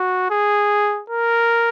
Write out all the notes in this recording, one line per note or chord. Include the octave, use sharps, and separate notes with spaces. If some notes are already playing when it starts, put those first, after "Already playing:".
Already playing: F#4
G#4
A#4